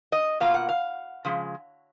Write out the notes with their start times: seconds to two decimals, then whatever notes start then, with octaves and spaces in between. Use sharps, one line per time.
0.12 D#5
0.40 B2 A#3 F4 F5
0.54 F#5
0.69 F5
1.25 C#3 F3 G#3